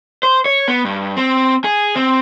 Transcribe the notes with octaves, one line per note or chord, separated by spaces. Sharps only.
C5
C#5
B3
G2
C4
G#4
C4